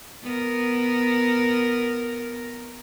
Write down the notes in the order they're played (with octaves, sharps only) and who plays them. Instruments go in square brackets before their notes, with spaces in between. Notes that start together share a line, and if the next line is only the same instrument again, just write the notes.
[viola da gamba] B3 A#4